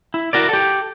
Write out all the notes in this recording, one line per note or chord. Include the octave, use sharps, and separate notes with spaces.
E4
E4 F#4 A#4 D5
G4 A4